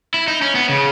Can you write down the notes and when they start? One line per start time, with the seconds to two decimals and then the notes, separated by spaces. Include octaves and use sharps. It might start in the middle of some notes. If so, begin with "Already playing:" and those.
0.14 E4
0.28 D#4
0.42 C#4
0.55 B3
0.69 C#3